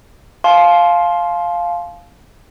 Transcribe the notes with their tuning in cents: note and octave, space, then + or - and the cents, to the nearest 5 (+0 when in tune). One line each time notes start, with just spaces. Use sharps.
F5 +0 A5 -40 C6 +5